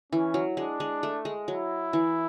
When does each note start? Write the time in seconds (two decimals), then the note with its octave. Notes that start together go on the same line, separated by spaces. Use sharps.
0.12 E3 C#4
0.34 F#3
0.57 G#3 D4
0.80 G#3
1.03 A3
1.25 G#3
1.48 F#3 E4
1.93 E3